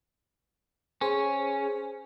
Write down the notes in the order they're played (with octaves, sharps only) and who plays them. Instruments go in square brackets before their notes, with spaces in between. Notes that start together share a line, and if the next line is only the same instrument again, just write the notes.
[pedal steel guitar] C#4 [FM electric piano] G#4 C5 G#5